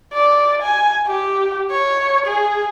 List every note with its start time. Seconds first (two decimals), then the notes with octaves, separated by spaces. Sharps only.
0.13 D5
0.63 G#5
1.07 G4
1.71 C#5
2.27 G#4